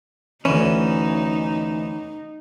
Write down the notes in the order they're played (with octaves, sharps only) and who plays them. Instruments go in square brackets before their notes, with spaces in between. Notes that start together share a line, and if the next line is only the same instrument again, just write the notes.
[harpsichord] D2 E3 [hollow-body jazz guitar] C#4 [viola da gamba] D#4